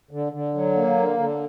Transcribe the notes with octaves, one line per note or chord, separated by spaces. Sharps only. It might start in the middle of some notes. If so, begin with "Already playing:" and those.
D3
D3
F#3
A#3
D3
D3